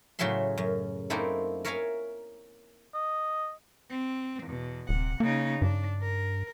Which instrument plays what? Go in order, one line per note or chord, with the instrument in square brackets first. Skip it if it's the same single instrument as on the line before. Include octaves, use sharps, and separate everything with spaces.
[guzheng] A2 C#3 F#3 G#4 E5 C6
F#2
A3 A#3 C4 D#4 E4 A4
A#4 C#5 E5 F5 G#5 A#5
[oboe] D#5
[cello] C4
E2 B2
[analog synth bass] D#1 [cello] C3 F#5
[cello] C#3 D#4 [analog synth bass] A#3
[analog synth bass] G2 [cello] D4
[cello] A#4